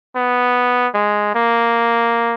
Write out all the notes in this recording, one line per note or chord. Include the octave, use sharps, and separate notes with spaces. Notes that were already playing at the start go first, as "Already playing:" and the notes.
B3
G#3
A#3